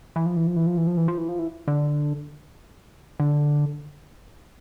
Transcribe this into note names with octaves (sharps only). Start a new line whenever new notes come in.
E3
F3
E3
F3
E3
F3
E3
F3
E3
F3
E3
F3
E3
D3
D3